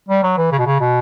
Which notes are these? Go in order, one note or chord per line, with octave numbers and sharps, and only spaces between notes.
G3
F#3
E3
C#3
B2
C#3
B2